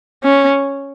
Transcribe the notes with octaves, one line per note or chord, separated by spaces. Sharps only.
C#4